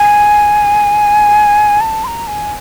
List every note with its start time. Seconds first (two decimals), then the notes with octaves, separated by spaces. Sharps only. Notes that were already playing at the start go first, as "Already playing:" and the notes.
Already playing: G#5
1.81 A5
2.04 C6
2.07 A#5
2.27 G#5